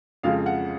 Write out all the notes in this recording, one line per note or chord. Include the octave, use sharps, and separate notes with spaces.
F2 C#3 F3 G#3 F5
F#5